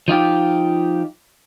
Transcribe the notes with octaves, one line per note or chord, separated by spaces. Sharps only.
F3 D#4 F4 G4